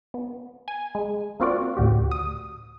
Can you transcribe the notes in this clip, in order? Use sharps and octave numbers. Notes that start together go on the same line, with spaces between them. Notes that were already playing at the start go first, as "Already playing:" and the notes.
B3
G#5
G#3
A#3 C4 F4 F#4 D5
D2 A2 F#4 G4
D#6